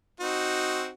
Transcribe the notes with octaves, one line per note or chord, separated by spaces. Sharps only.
C4 D#4 F#4